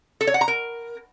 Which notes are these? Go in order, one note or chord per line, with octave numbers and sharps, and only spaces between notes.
A4
C#5
F#5
A#5
A#4